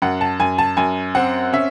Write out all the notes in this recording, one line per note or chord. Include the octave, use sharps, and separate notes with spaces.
F#2 F#5
A5
F#2 G#5
A5
F#2 G#5
C4 F#5
C#4 E5